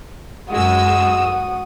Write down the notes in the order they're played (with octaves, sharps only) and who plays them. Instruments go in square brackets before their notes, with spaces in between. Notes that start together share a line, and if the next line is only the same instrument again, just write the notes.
[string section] F#2 G#3 E6 [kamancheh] F#4 D#6